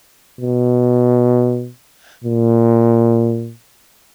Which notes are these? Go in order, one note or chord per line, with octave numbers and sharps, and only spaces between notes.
B2
A#2